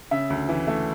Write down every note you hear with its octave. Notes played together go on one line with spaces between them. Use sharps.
C#3 E5
D2
E3
A3